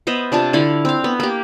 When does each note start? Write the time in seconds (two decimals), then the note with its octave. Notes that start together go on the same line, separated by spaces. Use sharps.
0.07 B3 C5 D#5 E5
0.32 C3 D4 F4 A5
0.53 D3 E4 F5
0.85 C4 F5
1.04 B3
1.20 A#3 G4